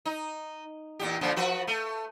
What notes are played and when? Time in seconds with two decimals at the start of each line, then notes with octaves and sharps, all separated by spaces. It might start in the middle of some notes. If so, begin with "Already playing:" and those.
0.05 D#4
0.99 E2 A#2 G4
1.21 A#2 D3 F3
1.36 F3 F#4 B4
1.67 A3